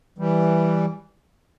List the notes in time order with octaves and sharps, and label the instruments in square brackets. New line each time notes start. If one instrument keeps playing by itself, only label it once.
[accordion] E3 G3